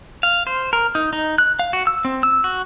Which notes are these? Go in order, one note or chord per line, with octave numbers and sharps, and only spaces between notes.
F5
C5
A#4
D#4
D#4
F#6
F5
F#4
E6
C4
E6
F#4